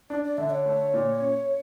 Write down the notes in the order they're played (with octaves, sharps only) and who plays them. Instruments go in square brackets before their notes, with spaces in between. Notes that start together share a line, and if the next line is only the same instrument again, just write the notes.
[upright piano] D4 [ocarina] D5
[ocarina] D5
[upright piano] D3 [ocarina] E5
[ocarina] C#5
[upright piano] A3
A#2
C#4